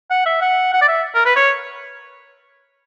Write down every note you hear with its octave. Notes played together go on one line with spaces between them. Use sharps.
F#5
E5
F#5
F#5
D5
E5
A#4
B4
C#5